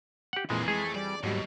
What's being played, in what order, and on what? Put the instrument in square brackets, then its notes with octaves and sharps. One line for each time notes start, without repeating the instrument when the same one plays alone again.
[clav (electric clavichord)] G4 F#5
[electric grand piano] F2 E3 [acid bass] A#2 [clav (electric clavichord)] G#3 [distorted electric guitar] A#3 G#4
[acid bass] G#3 [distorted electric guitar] A3 [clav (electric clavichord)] G#4
[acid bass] G3 [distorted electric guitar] D5
[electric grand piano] D#2 F#3 G3 [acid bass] G#2 [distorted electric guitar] B2